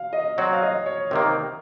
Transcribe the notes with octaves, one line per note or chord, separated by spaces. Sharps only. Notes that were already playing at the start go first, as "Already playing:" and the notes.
Already playing: F5
D#5
F#3 C4 F#4 C#5
F5
D#5
C#5
C3 D#3 A#3 A#4